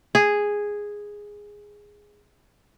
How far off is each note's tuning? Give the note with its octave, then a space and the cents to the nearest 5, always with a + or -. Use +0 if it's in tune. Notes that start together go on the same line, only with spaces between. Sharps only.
G#4 -5